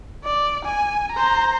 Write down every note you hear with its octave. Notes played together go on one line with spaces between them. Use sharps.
D5
G#5
C5 A#5